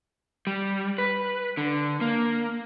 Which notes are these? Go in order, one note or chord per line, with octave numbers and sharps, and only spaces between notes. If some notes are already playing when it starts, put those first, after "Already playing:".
G3
B4
D3
A#3